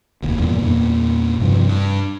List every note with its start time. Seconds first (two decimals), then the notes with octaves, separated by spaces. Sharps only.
0.22 F1 D#2
0.40 E2 G2 A#2
0.63 E2 A#2 A#3
1.40 G2 C3 F3
1.67 G2